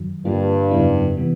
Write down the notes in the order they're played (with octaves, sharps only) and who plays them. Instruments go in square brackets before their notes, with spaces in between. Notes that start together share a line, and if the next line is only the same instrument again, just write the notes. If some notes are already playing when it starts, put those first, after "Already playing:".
Already playing: [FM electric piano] F#2 D#3 F#3
[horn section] G2 [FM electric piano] D3 G3 A#3 D4 F4
[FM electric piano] F2 C#3 F#3 B3 E4
C3 E3 G3 B3